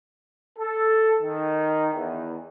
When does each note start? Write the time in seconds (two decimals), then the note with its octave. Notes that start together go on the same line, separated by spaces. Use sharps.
0.58 A4
1.21 D#3
1.94 E2